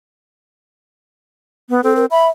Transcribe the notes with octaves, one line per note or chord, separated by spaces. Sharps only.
B3
C4 A4
A#4
E5 B5